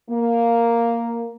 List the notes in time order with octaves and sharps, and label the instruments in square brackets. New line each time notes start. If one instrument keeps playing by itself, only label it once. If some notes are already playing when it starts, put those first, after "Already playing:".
[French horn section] A#3